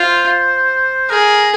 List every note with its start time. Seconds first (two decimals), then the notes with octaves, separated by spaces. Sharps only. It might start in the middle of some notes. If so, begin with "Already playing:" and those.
Already playing: F4 C5
1.10 G#4 A#4